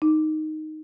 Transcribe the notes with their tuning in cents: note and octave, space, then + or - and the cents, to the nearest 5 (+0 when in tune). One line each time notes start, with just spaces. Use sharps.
D#4 +0